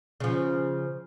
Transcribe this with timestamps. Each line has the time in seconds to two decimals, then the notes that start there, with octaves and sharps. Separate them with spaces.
0.20 C#3 F3